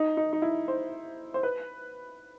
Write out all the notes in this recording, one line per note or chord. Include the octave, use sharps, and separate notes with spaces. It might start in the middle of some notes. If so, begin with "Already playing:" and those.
Already playing: D#4
D#4
D#4
E4
C5
C5
B4